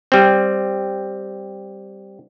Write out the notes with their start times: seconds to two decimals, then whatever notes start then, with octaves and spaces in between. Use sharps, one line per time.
0.12 G3 C4